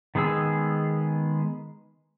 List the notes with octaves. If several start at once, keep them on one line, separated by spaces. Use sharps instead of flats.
D#3 G#3 B3 G#4 E6